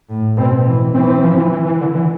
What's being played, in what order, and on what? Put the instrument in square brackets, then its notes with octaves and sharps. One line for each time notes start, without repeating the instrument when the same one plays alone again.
[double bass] A2
[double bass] B2 [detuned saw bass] C4
[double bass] E3
[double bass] E3 [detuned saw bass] C4
[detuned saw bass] C4
F3
E3
E3
E3
D3
E3